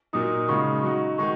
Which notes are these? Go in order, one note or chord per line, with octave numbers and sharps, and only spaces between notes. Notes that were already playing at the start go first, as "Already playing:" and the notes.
A#2 F#3 D#4 D#6
C#3 G#3 D#4 F#4 C#6
F#3 D#4 F#4
D#3 G#3 D#4 F#4 C#6